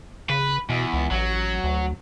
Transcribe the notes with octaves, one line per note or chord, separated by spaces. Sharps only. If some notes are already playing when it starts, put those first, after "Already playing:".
C#3 B4
E2 B2
C#2
A1 F#3
D2